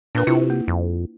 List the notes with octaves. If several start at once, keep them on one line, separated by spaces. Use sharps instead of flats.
A#2 D4 A#4 B4
C3 E4 F4
A#3
F2